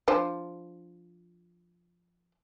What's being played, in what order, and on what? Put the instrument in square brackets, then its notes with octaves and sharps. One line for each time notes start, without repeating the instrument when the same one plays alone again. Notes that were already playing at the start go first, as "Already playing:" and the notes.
[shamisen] F3 D4 C5